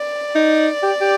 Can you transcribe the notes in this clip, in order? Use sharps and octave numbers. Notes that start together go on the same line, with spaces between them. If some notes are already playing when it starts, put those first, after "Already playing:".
Already playing: D5
D#4
G4
G4